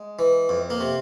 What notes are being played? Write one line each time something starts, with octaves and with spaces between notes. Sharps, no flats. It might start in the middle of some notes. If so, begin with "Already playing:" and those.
Already playing: G#3
E3
F2
A#3
C3